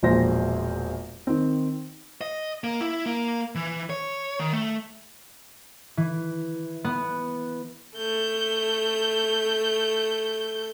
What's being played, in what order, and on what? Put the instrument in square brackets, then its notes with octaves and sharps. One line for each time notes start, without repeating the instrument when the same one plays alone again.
[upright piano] E1 A#1 A#2 C5 A#6
D#3 C4
[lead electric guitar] D#5
A#3
E4
A#3
E3
C#5
D#3
A3
[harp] E3
B3
[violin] A3 G6